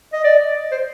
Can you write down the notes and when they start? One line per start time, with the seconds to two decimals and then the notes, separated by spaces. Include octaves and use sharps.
0.13 D#5
0.24 D5
0.71 C5